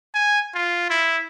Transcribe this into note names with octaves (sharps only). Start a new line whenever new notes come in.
G#5
F4
E4